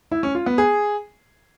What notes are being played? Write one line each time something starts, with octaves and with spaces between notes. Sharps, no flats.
E4
C#4
F4
B3
G#4